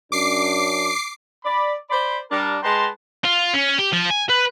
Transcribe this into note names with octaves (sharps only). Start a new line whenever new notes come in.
F#2 C#4 D4 D6 C7
D5 B5
C5 D5 B5
G3 D4 A#4
G#3 B4 G5 A5 A#5 C6
F4
C#4
G4
F3
G#5
B4